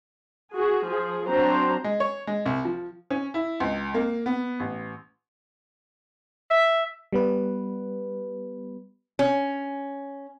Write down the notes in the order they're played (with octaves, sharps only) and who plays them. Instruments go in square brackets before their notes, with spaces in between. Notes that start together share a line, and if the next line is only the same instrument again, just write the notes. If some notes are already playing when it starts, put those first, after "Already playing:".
[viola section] F#4 G#4
F3 G#4
F#3 C4 D4 C5 A#5
[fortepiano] G#3
C#5
G#3
C2
F3
[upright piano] C#4
E4
C#2
A#3
B3
A1
[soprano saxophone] E5
[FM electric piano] G3 B3 B4
[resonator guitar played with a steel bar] C#4